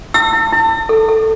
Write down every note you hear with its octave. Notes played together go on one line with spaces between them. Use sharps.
E4 E6
E4
E4
E4
A4
A4